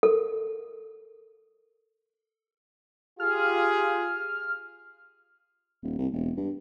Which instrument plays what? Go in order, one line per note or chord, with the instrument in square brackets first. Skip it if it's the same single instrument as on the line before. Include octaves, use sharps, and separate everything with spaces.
[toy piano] A4 A#4
[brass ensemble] F4 G4 G#4 [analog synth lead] F6
[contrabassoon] D#1
C2
E1
G2